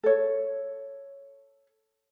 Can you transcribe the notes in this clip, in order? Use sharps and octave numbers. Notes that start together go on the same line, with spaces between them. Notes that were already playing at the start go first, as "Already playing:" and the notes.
A4 C#5